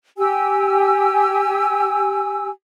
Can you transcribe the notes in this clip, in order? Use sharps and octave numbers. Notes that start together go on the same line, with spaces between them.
G4 G#5 E6